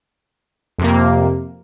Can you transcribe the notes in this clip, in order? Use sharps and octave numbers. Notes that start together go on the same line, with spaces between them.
F2 C3 A#3